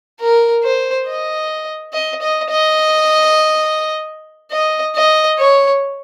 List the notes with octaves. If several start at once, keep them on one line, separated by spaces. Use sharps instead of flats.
A#4
C5
D#5
D#5
D#5
D#5
D#5
D#5
C#5